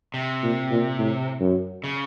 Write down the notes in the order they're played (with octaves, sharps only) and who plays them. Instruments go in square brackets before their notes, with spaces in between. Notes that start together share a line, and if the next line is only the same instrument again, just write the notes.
[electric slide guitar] C3
[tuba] A#2
A#2
A2
F#2
[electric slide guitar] C#3